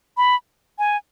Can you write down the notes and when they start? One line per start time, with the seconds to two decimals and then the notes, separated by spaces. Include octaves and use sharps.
0.17 B5
0.79 G#5